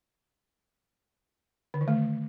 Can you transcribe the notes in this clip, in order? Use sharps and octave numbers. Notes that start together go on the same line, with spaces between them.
D3
D#3
A3